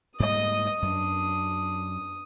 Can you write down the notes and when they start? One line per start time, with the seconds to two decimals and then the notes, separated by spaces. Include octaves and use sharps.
0.20 G#2 G3 A#3 D#5 D#6
0.82 F#2 D4